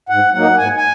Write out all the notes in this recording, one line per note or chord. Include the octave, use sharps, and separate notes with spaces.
G#2 F#5
F#3 A#3 D#4 F#5
G#2 G#5
G#5